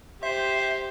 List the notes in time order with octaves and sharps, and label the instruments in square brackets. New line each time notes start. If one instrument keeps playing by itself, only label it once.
[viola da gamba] G4 [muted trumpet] C5 [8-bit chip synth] E5